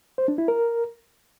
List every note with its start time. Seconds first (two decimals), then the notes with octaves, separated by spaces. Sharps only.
0.18 C5
0.28 D4
0.38 E4
0.48 A#4